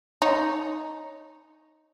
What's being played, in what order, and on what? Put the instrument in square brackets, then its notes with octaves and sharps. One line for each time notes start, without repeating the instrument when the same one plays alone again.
[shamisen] D#4 C#5